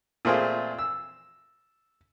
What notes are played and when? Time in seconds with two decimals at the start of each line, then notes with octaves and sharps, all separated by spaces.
0.25 A#2 A3 C4 F4 G#4
0.79 E6